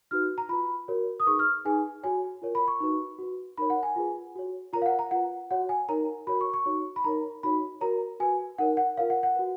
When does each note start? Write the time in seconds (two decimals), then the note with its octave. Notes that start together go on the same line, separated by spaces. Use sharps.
0.11 D#4 F#4 B4 F6
0.38 A#5
0.49 F4 B4 B5
0.88 F#4 A#4 C#5
1.20 D#6
1.26 D#4 G#4 B4 C#6
1.39 F6
1.65 D#4 G#4 B4 G#5
2.03 F#4 C#5 G#5
2.42 F4 A#4 C#5
2.55 B5
2.68 C#6
2.80 D#4 F#4 B4
3.19 F#4 B4
3.57 D#4 A#4 C#5 B5
3.70 F#5
3.83 G#5
3.96 F4 G#4 B4
4.35 F#4 C#5
4.73 F4 A#4 C#5 A#5
4.82 F5
4.86 F#5
4.99 A#5
5.11 F4 B4 F#5
5.51 F#4 C#5 F#5
5.69 G#5
5.89 D#4 A#4 C#5 A#5
6.27 F#4 A#4 C#5 B5
6.41 C#6
6.54 C#6
6.66 D#4 F#4 C#5
6.96 B5
7.04 D#4 A#4 C#5 A#5
7.43 D#4 F#4 C#5 B5
7.81 F#4 A#4 C#5 A#5
8.20 F#4 B4 G#5
8.58 D#4 A#4 C#5 F#5
8.77 F#5
8.97 F4 A#4 C#5 F5
9.10 F#5
9.23 F#5
9.36 F#4 B4